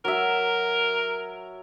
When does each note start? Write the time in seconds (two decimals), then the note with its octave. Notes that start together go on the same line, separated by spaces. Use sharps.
0.05 F#3 A#4 E5